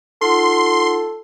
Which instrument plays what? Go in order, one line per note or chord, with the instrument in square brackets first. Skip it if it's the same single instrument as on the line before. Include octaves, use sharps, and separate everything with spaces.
[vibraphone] D#4 F4 F#5 [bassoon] A4 [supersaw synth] C6